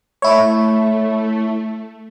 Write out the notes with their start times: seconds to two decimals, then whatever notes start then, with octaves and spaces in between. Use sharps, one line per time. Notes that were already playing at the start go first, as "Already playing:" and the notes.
0.22 A3 E4 C#5